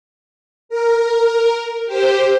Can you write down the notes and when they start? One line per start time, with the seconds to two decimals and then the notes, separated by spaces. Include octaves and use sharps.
0.69 A#4
1.86 G4 C5